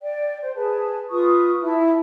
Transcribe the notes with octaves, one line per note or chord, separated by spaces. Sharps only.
D5 G5
C5
G#4 B4 A5
F4 B4 C#6 D#6
E4 E5 A5